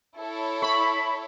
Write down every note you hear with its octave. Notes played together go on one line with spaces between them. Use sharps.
E4 A4 C#5
B5 C#6